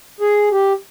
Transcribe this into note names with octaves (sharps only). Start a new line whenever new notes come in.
G#4
G4